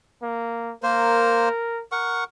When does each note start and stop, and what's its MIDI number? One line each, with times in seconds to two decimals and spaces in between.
0.23 0.73 58
0.83 1.49 58
0.83 1.82 70
0.83 1.49 72
1.92 2.24 70
1.92 2.24 78
1.92 2.24 85